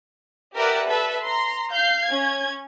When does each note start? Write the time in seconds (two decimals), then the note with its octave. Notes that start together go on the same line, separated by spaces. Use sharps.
0.55 G4 A#4 B4 D5 E5 F#5
0.90 A4 B4 E5
1.26 A#5 C6
1.73 F5 G6 C7
2.06 C#4 G#6